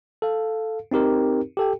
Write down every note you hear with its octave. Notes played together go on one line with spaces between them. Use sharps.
A4 F5
C4 D#4 G4 A#4
G4 A4 G5